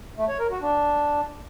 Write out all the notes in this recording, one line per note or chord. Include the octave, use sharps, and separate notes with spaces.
A3
C#5
A#4
F#4
D4